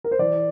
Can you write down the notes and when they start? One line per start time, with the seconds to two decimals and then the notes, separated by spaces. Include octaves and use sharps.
0.04 A#4
0.11 C5
0.19 E3 D5